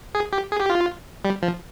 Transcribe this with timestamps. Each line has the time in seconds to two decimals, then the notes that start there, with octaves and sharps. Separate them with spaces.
0.15 G#4
0.33 G4
0.51 G#4
0.60 G4
0.70 F4
1.25 G3
1.43 F3